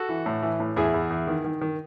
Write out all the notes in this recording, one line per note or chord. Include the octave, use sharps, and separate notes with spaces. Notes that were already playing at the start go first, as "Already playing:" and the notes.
Already playing: F#4 A4
E3
A2
E3
A2
E2 E4 G#4
E2
E2
D#3
D#3
D#3